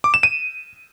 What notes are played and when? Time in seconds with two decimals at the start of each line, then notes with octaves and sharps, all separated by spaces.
0.04 D6
0.14 E7
0.23 D#7